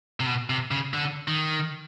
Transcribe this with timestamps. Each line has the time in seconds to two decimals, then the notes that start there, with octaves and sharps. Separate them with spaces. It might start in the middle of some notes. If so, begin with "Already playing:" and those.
0.20 C3
0.27 B2
0.50 C3
0.71 C#3
0.94 D3
1.28 D#3